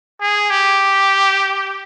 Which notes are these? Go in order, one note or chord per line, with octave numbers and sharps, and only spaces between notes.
G#4
G4